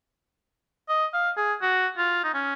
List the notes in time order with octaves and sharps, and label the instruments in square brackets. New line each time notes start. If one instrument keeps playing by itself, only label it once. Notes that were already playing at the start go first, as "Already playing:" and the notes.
[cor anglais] D#5
F5
G#4
F#4
F4
D#4
C#4